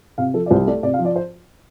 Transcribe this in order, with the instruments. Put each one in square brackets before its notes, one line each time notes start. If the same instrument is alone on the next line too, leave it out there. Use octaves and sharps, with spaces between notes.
[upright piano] C3 F5
F3 A4
D5
C2 C5
A3 D5
C3 D5
F5
F3
D5
C5